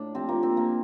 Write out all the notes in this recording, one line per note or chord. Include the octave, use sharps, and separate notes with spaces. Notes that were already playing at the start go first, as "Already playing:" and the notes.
Already playing: A2 D4
C3 F3 C4
A#3
C4
A#3